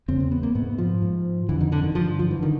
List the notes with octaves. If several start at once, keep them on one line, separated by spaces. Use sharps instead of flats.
E2 C#3 C4
C4
B3
A#3
G#2 B3
F3
G#2
F2 D3 E3
D#3
D3
D#3
G2 D3 F3
F3
E3
D3 D#3